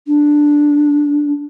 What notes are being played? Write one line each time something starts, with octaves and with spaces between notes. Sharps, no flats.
D4